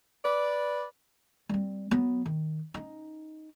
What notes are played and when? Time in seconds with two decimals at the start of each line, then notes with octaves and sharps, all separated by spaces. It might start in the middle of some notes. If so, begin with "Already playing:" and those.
0.23 B4 D5
1.49 G3 C4
1.91 F#3 B3
2.25 D#3
2.74 C#4 D#4